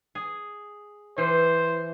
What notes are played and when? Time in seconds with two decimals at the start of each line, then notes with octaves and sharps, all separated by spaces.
0.15 G#4
1.18 E3 C5